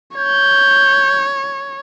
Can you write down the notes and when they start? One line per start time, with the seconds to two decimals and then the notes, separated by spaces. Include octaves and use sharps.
0.16 C#5 G6